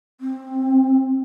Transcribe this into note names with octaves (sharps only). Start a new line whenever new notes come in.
C4